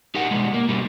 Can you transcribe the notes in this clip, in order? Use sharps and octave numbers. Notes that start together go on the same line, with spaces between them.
D#4 G4 A#4 F#5
B2 D#3 G3 G#3
A#3
B2 D3 G3 A3